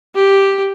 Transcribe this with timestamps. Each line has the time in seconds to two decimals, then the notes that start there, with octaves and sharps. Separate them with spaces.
0.14 G4